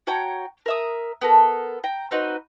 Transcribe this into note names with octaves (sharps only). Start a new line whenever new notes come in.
F#4 C#5 G5 A#5
A#4 E5 D#6
B3 A4 A#4
G5 A#5
C4 D#4 F#4 B4